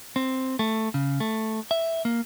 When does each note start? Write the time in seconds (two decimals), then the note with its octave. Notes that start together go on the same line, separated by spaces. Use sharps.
0.16 C4
0.59 A3
0.94 C#3
1.20 A3
1.71 E5
2.05 A#3